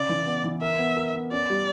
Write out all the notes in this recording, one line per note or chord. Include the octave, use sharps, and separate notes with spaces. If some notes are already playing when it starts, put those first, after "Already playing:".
Already playing: C#3 D5
E3
B3
E3
A#4 E5
B3
A#4
B3
C#4 D5
G3